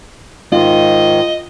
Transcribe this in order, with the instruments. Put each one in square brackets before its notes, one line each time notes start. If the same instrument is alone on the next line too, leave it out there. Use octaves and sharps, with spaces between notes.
[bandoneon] G#2 D#3 [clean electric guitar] F4 [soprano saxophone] D#5